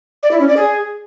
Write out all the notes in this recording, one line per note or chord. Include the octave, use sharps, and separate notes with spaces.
D5
E4
C#4
D5
G#4